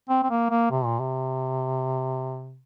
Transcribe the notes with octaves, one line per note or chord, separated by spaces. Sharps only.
C4
C4
A#3
A#3
C3
A#2
C3